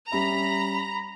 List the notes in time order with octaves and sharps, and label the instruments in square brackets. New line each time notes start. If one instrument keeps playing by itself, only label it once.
[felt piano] G3 C#4 E5 [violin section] A#5 [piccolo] B5